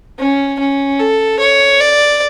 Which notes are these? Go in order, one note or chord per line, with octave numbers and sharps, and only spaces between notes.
C#4
C#4
A4
C#5
D5